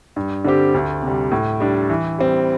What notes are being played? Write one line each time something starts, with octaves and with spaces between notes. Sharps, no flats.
G2
D3 G3 C4 G4
D2
C3
G3
A2
G3 D4
E3
G3 C4